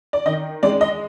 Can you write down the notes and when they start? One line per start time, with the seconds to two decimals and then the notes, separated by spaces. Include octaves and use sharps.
0.13 D5
0.26 D#3 D#5
0.63 G#3 D5
0.81 D#5